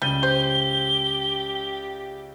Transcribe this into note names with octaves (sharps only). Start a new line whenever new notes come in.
C#2 C#3 G3 D#7 G7
G4 C5